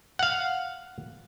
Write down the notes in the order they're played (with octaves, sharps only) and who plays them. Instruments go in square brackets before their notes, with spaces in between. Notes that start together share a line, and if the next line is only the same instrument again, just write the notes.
[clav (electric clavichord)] F5 F#5